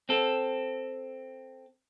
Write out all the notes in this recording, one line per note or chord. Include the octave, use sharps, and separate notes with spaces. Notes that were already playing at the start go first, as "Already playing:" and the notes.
C4 A4